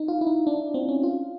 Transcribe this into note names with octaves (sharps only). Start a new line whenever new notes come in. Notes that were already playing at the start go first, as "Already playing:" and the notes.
Already playing: D#4
F4
E4
D#4
D4
C4
C#4
F4